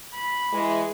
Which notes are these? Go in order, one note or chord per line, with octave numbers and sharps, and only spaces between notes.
B5
E3 G#3